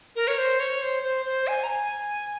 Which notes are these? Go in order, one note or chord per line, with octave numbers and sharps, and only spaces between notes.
A#4
C#5
C5
C#5
C5
C5
C5
G#5
A#5
G#5